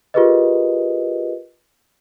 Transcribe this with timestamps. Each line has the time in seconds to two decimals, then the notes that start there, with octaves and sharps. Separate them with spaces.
0.14 F4 G4 G#4 A#4 B4 D#5